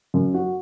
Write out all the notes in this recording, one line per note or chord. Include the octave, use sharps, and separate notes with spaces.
F#2
F#4